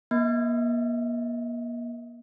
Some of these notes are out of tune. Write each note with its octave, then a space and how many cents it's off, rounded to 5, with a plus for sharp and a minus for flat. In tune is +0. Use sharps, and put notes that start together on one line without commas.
A#3 +40 D#5 +40